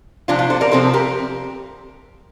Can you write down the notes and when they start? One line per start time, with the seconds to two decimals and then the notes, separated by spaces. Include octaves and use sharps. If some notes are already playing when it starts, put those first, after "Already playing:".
0.28 C3 F3 C4 D4 F4
0.39 D4 F4
0.50 A4 C5
0.61 A#4 D5
0.71 C3 F3 C4 A4 C5
0.93 G4 A#4